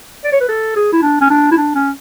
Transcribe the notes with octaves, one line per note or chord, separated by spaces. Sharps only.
D5
C#5
B4
A4
G#4
E4
D4
C#4
D4
E4
D4
C#4